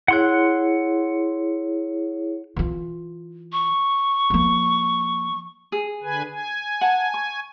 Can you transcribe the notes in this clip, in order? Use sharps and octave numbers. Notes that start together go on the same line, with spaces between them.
E4 G#4 C#5 F#5 C6 F#6
E3 F4
C#6
F3 A#3
G#4
D3 B4 G#5
G#5
F#5 A5
C#6